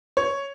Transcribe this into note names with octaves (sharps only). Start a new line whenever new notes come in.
C#5